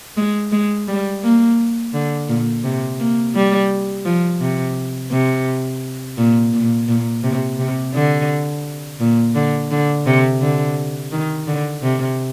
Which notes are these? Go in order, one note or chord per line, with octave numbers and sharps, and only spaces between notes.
G#3
G#3
G3
A#3
D3
A#2
C3
A#3
G3
F3
C3
C3
A#2
A#2
A#2
C3
C3
D3
A#2
D3
D3
C3
D3
D#3
D3
C3